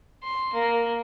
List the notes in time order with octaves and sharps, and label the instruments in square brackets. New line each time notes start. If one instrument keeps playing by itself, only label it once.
[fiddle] C6
A#3